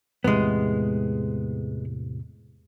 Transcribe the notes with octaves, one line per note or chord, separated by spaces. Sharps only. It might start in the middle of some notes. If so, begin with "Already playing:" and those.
E2 A2 C3 G#3 B3